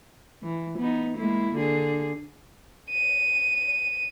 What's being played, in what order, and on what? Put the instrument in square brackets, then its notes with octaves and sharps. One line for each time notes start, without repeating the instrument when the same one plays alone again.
[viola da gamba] E3
B3 D#4
G#3 A#3 E4
D3 G#4
[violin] D#7